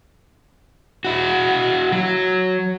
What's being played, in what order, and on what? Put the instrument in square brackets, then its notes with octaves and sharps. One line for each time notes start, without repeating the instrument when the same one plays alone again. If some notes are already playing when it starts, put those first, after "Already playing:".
[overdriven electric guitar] E4 F#4
F#3